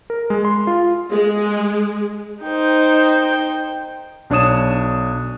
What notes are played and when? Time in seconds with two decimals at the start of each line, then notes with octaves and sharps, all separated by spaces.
0.10 A#4
0.30 G#3
0.45 C6
0.67 F4
1.11 G#3
2.43 D#4 C5 G5
4.30 B1 D4 C#5 D#6 E7